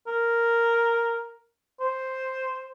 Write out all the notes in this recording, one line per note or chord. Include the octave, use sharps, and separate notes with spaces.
A#4
C5